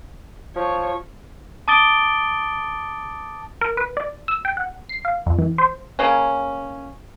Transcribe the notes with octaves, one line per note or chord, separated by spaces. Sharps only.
F3 C#5
A5 D6 D#6 A6 D7 G7
A#4
B4
D5
E6
G5
F#5
C7
F5
F2
E3
C5
C#3 A#3 C#4